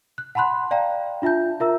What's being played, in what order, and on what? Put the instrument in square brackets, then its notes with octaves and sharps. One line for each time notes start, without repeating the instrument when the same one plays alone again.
[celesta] F#6
F#5 A5 B5 C6 F#6
D5 F5 G5 A#5
D4 F4 E5 A5 G6
F4 A#4 E5 A#5 E6